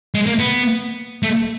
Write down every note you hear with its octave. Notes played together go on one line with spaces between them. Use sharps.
G#3
A#3
B3
A3